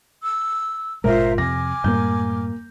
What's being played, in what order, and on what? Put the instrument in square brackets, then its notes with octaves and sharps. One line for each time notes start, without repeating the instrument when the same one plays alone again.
[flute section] E6
[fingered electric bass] G1 A#2 G#3 [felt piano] F4 A#4 [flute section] C5 E5 A#5
[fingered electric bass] F2 C3 [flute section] G#5 D6 F6 [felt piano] A#6
[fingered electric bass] F#2 A2 G3 [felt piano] A#3 G6